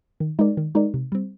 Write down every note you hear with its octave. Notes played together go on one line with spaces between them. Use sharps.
D#3
G#3 D#4 A#4 D5
D#3
G#3 D#4 A#4 D5
C3
G3 C4